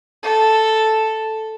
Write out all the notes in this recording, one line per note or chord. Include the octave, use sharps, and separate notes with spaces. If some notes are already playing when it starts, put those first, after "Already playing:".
A4